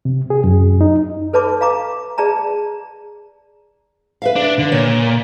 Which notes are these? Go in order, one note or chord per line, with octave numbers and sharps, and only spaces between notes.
C3
G#4
F#2
D#4
A4 B4 C#5 A5 B5 D6
F5 A#5 D6
G#4 D5 A5 A#5
B4 E5 F5
D4
D3
A#2 C#5